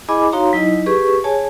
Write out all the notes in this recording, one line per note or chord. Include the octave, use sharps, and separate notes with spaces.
E4 G#4 D#5 G#5 B5 D6
D#4 F#4 C#5 F5 A#5 C6
F#3 D#4 E4 D#5
G4 G#4 B4 C#6
G#4 C#5 G#5 A5